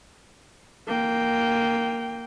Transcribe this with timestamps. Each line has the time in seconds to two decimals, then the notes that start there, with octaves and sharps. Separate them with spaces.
0.87 A#3 G5